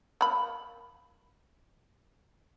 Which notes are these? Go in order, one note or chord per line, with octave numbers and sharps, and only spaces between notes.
A#3 B5